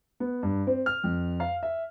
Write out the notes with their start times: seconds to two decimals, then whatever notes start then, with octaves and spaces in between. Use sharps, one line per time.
0.20 B3
0.43 G2
0.67 C4
0.86 F6
1.04 F2
1.40 F5
1.63 E5